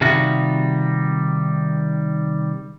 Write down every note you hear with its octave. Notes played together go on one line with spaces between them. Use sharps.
C3 D#3 G3 F4 F#4